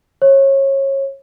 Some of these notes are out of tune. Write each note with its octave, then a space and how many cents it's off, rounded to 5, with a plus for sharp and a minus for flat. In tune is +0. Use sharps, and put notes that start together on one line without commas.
C#5 -25